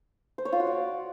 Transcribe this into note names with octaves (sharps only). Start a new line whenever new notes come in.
C5
C#5
F4
F#4
D5